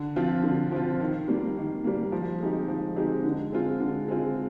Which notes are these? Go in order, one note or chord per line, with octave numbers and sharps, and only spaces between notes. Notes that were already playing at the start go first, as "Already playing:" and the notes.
Already playing: D3
F3 C4 F4
D3
F3 C4 F4
D#3
G3 A#3
D#3
G3 A#3
F3
G#3 C4 D#4 G4
F3
G#3 C4 D#4 G4
D3
G#3 C4 F4
D3
G#3 C4 F4